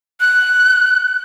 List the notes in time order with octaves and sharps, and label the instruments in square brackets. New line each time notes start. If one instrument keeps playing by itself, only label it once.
[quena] F#6